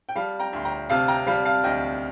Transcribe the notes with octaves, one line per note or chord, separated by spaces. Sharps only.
G5
G3 F5 A5
G5 A#5
D2 C6
G5 A#5
C3 F5 A5
G5 A#5
G3 F5 A5
F5 A5
D2 D#5 G5